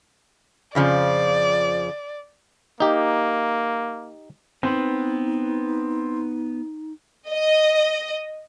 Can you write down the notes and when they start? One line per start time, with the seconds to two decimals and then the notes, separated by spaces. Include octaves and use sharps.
0.75 F2 C#3 F3 D5
2.80 A#3 D#4 G4
4.63 B3 C4 D#4 B4
7.29 D#5